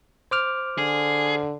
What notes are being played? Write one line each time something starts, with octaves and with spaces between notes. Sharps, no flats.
C5 D6 F6
D3 G#4